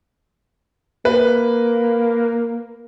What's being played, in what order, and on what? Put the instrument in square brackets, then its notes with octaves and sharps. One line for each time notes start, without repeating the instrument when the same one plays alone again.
[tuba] A#3 [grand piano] B4